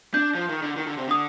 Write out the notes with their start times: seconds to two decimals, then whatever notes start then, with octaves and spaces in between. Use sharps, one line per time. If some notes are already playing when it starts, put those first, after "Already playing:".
0.14 D4 G6
0.35 F3
0.49 D#3
0.62 D3
0.76 D#3
0.87 D3
0.97 C3
1.08 D3 D#6